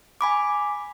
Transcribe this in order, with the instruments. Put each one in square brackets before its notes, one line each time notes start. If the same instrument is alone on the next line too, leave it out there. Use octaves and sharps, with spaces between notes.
[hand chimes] G#5 B5 D6